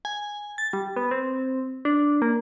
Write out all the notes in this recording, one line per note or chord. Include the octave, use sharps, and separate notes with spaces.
G#5
A6
G3
B3
C4
D4
A#3